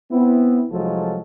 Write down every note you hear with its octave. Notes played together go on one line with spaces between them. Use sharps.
B3 C4 E4
C2 F3 F#3 G#3 F4 A4